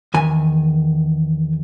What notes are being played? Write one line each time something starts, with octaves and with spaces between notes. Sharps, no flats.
E2 D#3 G#5